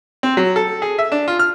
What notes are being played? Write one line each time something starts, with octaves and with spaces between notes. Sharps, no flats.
C4
F#3
A4
G#4
E5
D4
F4
F6